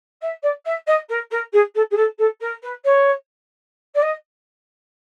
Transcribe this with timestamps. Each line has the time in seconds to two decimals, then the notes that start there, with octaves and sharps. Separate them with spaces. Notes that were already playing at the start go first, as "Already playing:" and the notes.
0.21 E5
0.43 D5
0.65 E5
0.87 D#5
1.09 A#4
1.31 A#4
1.53 G#4
1.75 A4
1.91 G#4
1.96 A4
2.18 A4
2.40 A#4
2.62 B4
2.84 C#5
3.95 D5
4.02 D#5